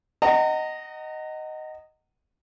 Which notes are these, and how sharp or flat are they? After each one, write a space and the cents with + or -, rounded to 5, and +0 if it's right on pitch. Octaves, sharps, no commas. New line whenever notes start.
D#5 +0 F#5 +25 A#5 -30